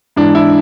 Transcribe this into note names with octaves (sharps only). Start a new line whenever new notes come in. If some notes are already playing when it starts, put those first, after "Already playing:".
G#2 E3 D4
E4